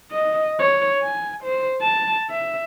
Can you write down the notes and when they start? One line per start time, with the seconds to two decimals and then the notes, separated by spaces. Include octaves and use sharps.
0.11 D#5
0.59 C#5
1.02 G#5
1.44 C5
1.81 A5
2.30 E5